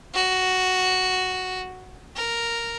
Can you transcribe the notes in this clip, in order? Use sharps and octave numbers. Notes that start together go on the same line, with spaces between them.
F#4
A#4